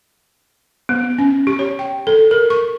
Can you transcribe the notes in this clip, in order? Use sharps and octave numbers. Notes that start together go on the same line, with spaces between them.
B3
C#4
G4
C#5
G5
A4
A#4
C#6